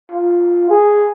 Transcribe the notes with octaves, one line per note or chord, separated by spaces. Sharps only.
F4
G#4